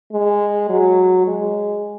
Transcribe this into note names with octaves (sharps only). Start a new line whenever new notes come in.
G#3
F#3
G#3